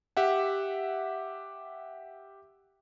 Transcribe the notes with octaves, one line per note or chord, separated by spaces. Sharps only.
G4 E5 F#5